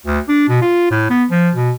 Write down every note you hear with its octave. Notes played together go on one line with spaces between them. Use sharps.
D2
D4
B2
F4
A2
B3
F3
B2